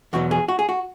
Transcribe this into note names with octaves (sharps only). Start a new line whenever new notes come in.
E2 B2 F#3 F#4
G#4
F#4
G#4
F#4